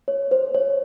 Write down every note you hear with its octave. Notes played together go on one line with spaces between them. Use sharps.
C#5
C5
C#5